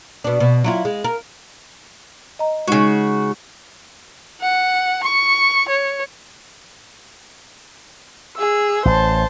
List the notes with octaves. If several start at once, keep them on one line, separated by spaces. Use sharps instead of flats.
B2 D4
B2
F#3 E4 F4
G#3
A#4
D#5 A#5
C#3 G#3 D#4 F#4
F#5
C#6
C#5
G#4 E6
A1 C5 A5